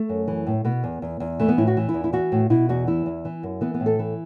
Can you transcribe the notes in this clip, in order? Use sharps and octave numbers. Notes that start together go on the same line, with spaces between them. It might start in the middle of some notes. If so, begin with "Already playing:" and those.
Already playing: A3
F#2
E3
A2
B2 B3
E2
E2
E2
E3 A3
B3
A2 E4
F#4
E3
E4
E2
E4
E3 F#4
A2
B2 E4
E2 F#4
E3 E4
E2
E3
F#2
E3 B3
B3
A2
A4
E3